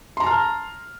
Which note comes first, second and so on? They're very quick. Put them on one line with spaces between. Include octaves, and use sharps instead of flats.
C6 A#5 A5 F6